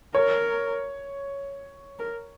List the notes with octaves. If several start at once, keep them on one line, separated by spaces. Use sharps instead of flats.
A#4 C#5
A#4